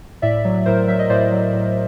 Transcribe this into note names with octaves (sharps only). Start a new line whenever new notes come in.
A2 D5 E5
F#3
A2 A#4 C5
F#3 E5
D#5
A2 C5 D5
F#3
A2